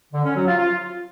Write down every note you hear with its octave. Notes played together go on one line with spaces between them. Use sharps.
D3
C#4
F#3
F4
F4